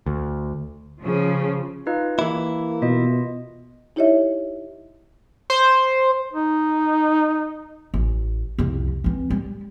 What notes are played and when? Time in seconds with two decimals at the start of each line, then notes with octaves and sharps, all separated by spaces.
0.06 D2
1.02 C#3 F3
1.87 D#4 F4 B4 D#5
2.19 E3 A#3 E4 G4
2.82 B2 F4 D#5
3.96 D#4 E4 G4 C#5 D#5 E5
5.50 C5
6.33 D#4
7.94 A1
8.58 C2 F2
9.04 E3 C4
9.30 G3